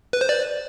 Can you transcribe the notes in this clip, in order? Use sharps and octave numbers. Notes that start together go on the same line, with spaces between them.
B4
C5
D5